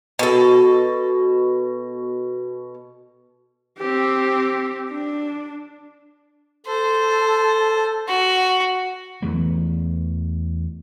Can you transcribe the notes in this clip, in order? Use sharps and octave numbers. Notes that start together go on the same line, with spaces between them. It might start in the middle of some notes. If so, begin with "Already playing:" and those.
B2 A4
C4 G4
D4
A4 C5
F#4
E2 E3 A3